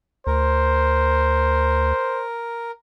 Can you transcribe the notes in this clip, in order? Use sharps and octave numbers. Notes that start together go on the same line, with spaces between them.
D2 A#4 C5